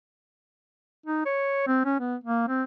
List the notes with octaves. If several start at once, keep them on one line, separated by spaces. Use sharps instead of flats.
D#4
C#5
C4
C#4
B3
A#3
C4